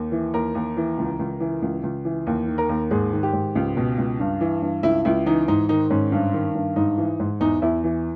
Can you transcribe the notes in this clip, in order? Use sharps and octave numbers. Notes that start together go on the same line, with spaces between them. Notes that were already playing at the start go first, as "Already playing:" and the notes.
Already playing: D#2
E3
D#2 A#4
D#2
E3
C#2
C#2
E3
C#2
C#2
E3
D#2
D#3
A#4
D#2
G#2 G#4
D#3
G4
G#2
C#2
B2
C#2
G2
E3
G2
C#2 E4
C#2 E4
E3 D#4
G#2 D#4
D#3 D#4
G#2 C#4
G2
D#3
G2
G#2 D#4
E3
G#2
E2 D#4
E2 E4
E3